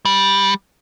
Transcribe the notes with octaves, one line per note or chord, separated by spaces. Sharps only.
G3